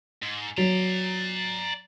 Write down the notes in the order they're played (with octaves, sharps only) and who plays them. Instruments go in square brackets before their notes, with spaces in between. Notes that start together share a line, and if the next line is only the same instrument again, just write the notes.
[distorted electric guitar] G#2
[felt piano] F#3 [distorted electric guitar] D5 A#5